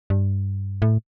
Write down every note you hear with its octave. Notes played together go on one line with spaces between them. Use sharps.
G2
A2